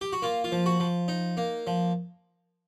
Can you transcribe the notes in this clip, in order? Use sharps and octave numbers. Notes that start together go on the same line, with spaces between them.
G4
F#4
A#3 F4
F4
F3
F#4
F3
D#4
A#3
F3